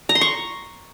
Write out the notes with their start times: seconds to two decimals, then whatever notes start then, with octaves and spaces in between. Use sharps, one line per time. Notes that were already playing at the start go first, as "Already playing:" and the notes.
0.09 A#5
0.15 C6
0.21 C#6